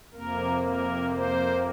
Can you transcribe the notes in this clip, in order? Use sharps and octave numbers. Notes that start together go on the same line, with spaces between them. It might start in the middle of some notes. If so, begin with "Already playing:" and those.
F2 C3 A#3 A#4
A#4
C5